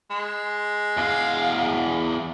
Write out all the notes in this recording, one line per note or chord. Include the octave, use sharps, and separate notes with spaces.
G#3
E2 F5